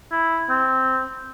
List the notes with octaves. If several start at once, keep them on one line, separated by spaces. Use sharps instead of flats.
E4
C4